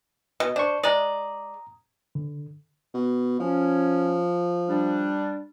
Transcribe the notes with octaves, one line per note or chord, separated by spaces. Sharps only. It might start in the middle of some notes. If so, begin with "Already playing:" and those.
B2 D#5
D4 C5 D5 C#6
G#3 D5 A#5 D#6
D3
B2
F3 C#4
G3 D4